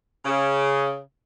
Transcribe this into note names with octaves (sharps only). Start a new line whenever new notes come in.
C#3